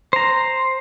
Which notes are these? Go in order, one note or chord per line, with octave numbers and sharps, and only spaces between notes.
C5 A#5